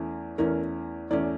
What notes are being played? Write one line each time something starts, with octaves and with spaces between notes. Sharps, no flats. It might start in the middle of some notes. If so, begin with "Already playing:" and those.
Already playing: E2 E3 A3 C#4
E2 E3 A3 C#4 A#4
E2 E3 A3 C#4 D5